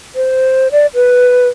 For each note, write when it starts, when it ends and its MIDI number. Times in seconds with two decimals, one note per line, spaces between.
0.15 0.68 72
0.72 0.86 74
0.95 1.48 71